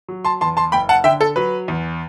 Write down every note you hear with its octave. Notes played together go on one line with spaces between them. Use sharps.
F#3
A5 C6
E2 A5 C6
A5 C6
F#1 G5 B5
F#5 A5
D3 E5 G5
A4
F#3 B4
E2